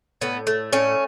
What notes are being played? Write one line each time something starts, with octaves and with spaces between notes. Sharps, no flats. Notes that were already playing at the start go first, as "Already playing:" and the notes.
A2 B3
A3
A2 C#4